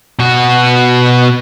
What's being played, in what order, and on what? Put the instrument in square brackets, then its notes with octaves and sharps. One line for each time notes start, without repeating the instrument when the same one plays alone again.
[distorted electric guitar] B2 F#4